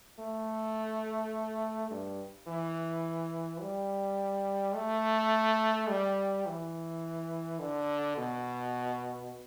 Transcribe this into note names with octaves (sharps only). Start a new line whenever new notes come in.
A3
G2
E3
G3
A3
G3
E3
D3
B2